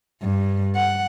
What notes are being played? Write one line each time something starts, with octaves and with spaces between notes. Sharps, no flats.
G2
F#5